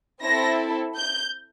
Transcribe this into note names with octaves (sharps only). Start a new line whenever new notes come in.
C4 E4 A4 A#6
G6